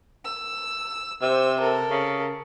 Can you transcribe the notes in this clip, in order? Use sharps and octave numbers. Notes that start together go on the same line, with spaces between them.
E6
C3 C5 E6
A4 A#4
C#3